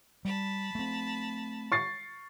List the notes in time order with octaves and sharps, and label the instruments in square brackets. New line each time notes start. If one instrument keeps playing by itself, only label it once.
[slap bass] G3 [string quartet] A5 B5
[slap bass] A3 C4
[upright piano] C#6 A6 C7